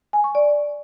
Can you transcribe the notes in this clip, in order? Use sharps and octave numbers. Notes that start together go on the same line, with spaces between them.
G#5
C#6
D5